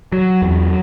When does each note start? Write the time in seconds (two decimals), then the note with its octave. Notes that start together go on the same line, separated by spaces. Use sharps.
0.12 F#3
0.42 E2